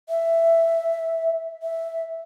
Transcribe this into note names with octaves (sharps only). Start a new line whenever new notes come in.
E5
E5